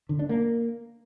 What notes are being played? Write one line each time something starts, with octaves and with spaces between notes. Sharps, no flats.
D3
D4
A#3